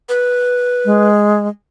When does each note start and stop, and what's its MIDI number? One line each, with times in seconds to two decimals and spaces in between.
0.09 1.09 71
0.85 1.48 56